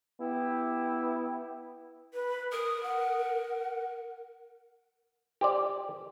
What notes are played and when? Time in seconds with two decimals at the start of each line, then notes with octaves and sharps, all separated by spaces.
0.21 B3 E4 G4
2.14 B4
2.52 A#4 D#6
2.83 F#5
5.41 G4 C5 D5